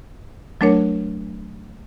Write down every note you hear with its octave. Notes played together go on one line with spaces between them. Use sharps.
F#3 A3 D4 A#4 C#5